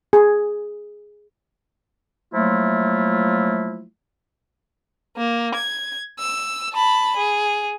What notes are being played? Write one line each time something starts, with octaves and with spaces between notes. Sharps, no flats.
G#4
F3 F#3 A3 A#3 E4 F4
A#3
G#6
E6
A5 B5
G#4